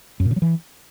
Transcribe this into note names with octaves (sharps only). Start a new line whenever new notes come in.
F#2
A#2
C#3
F#3
E3